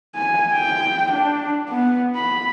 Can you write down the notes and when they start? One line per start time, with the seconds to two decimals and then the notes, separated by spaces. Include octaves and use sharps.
0.15 G#5
0.53 G5
1.13 D4
1.68 B3
2.16 B5